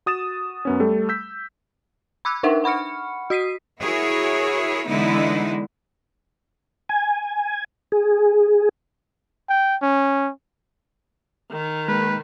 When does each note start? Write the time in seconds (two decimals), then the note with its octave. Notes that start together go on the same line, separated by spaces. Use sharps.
0.06 F#4 D#6 A6 E7
0.65 F#2 B3 C#4
0.80 G3 A3 A4
1.09 E6 G6 B6
2.25 B5 D6 E6 F#6 G#6
2.43 D4 D#4 A#4 E5 F#5
2.64 F#5 B5 C#6 F6 C#7
3.30 F#4 D#6 B6 C7 D#7
3.80 E4 F#4 G#4 A#4 C#5
4.86 E2 D3 G#3 B3 D#4 E4
6.89 G#5
7.92 G#4
9.49 G5
9.82 C#4
11.51 D#3
11.88 G#3 A#3 B4